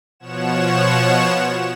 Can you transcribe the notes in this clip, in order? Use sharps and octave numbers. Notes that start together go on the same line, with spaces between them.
B2 F3 C#5 F#5 E7